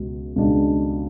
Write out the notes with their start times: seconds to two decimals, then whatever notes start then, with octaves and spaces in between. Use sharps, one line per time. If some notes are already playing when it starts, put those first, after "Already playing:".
Already playing: C#2 B2
0.36 C#2 B2 G#3 D4